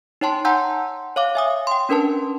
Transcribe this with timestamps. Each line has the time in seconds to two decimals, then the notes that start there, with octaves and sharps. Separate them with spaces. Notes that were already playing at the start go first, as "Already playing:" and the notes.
0.21 D#4 C#5 G5 A5 C6
0.45 F#5 G#5 A#5 C6 E6 G6
1.16 C#5 F5 D6
1.35 E5 G#5 D#6
1.67 G5 C6
1.89 C#4 D4 A#4 B4 A5